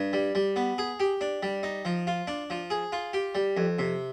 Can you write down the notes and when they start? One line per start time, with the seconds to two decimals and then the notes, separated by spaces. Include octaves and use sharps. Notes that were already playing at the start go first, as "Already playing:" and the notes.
Already playing: G2
0.13 G3
0.35 G3
0.56 B3
0.78 G#4
1.00 G4
1.21 D4
1.43 G3
1.63 D#4
1.85 F3
2.07 F4
2.27 D4
2.50 F3
2.70 G#4
2.92 F4
3.13 G4
3.35 G3
3.57 F2
3.79 C3